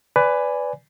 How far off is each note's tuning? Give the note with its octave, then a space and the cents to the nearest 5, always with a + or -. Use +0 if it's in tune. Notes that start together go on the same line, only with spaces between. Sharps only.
B4 +15 D5 -10 G#5 -5